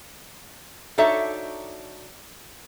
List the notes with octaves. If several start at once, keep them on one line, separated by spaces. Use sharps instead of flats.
D4 D#4 F#4 A4 C#5 E5